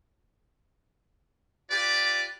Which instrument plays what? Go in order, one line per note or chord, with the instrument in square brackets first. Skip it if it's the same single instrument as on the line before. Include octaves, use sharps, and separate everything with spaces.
[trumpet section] F4 G4 B4 D5